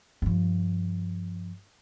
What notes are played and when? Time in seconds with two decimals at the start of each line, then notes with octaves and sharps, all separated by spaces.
0.22 G2 F3